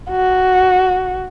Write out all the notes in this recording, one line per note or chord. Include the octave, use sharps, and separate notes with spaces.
F#4